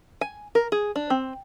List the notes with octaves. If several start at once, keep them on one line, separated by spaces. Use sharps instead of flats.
G#5
A#4
G#4
D4
C4